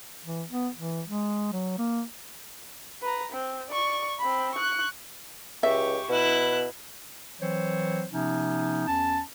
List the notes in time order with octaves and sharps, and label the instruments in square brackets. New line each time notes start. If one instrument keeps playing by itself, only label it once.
[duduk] E3
B3
E3
G#3
F#3
A#3
[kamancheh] B4 A#5
C4
D5 C#6
C4 B5
C#6 F#6
[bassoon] C#2 [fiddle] G4 C#6 [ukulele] E5
[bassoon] B2 [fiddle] E4 F#6
[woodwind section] E3 F#3 C4 C5 C#5
C3 F3 B3 C#4 D#4
E2 C#4 A5